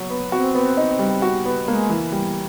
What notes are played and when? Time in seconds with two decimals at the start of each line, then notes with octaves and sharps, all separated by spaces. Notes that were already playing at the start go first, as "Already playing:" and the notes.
Already playing: F#3 F#4
0.10 B3
0.32 C4 F#4
0.55 B3
0.77 D#4
0.99 G3
1.22 F#4
1.45 B3
1.67 G#3 A#3
1.90 E3
2.12 G3